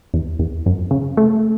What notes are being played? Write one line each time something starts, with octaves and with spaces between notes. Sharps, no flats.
E2
E2
F#2
C#3
A3